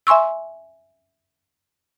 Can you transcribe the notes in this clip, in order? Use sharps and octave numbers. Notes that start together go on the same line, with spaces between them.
E5 G#5 C6 C#6 E6